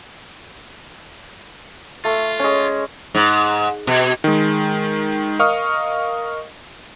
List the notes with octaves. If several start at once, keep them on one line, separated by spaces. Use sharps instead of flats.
A3 F4
G#3 C#4
G#2
B2
D#3 G#3
A#4 D#5 F5 C#6 D#6 F6